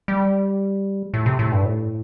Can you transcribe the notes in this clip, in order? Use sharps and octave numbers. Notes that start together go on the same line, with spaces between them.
G3
A2
C3
A2
G2
A2